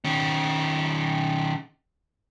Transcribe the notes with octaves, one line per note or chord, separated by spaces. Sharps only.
D#3 C#4